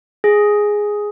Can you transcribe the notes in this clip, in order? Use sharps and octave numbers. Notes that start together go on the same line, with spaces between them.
G#4